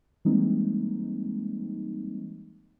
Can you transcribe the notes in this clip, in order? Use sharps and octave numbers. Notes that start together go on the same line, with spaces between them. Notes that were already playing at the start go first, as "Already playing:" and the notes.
E3 G3 G#3 A#3 C4 D#4